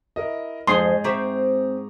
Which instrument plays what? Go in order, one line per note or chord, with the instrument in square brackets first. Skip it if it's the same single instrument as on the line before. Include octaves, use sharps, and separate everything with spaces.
[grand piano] E4 A#4 D#5
[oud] F2 F3 [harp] G#2 G#5 [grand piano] D#4 C5 D#6 [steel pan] C6
[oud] C4 E5 [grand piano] A#5 C#6 D6